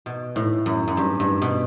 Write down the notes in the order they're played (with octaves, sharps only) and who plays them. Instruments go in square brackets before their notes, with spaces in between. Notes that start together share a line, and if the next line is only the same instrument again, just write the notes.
[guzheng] B2
A2
F#2
F#2
G2
G2
B2